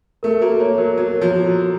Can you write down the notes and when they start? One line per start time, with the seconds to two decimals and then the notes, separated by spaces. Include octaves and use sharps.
0.23 A3 A#4
0.42 A#3 F#4
0.60 A#3 C#5
0.78 F#3 A#4
0.96 F#3 A#4
1.16 C#5
1.21 F3
1.33 F#4
1.45 F#3
1.52 F#4